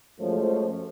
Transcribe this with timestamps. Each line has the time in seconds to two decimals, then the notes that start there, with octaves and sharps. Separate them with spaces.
0.19 F#2 F3 G#3 A3 C5 C#5